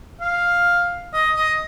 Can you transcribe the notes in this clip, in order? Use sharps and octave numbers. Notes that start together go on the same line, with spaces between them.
F5
D#5
D#5